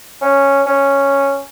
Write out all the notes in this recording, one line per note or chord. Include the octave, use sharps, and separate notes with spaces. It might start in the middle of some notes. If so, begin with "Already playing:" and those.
C#4
C#4